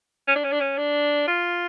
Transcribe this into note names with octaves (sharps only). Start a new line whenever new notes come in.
C#4
D4
C#4
D4
C#4
D4
F4